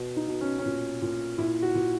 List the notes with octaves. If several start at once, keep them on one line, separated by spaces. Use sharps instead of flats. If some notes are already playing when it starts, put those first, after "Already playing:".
Already playing: B2
D#4
B2
C#4
C#4
A#2
A#2
A#2 E4
F#4
A#2